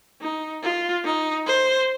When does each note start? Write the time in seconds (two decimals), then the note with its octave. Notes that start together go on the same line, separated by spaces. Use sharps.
0.22 D#4
0.63 F4
1.05 D#4
1.46 C5